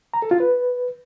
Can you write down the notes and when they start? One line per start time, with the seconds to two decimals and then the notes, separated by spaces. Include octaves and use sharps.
0.14 A#5
0.22 A4
0.31 F4
0.40 B4